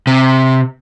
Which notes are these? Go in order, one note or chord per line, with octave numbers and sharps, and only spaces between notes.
C3